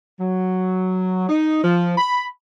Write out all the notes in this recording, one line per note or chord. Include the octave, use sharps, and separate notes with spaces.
F#3
D#4
F3
B5